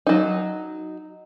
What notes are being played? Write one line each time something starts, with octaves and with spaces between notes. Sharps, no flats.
F#3 D#4